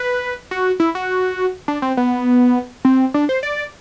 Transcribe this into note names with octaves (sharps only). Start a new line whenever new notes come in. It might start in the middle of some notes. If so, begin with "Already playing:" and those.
Already playing: B4
F#4
E4
F#4
D4
C4
B3
C4
D4
C5
D5